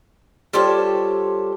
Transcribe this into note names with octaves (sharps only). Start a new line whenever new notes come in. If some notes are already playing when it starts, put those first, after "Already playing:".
G3 F4 G4 A4 C5 C#5